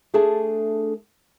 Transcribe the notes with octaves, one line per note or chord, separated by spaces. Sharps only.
A3 D4 G#4 A4 E5 A5